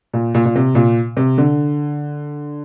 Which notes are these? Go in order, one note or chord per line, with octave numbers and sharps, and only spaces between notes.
A#2
A#2
A#2
C3
A#2
C3
D3